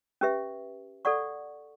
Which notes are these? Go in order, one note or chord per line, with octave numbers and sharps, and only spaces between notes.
C#4 G4 B4 E5
A4 D5 F#5 C#6